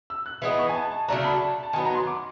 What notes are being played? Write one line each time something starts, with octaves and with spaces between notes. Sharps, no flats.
E6
F#6
E3 G#3 B3 D#4
C#6
G#5
A5
A5
C#3 F#3 A3 D4 A#5
B5
A5
A5
D#3 F#3 B3 G#5
A#5
C6
D6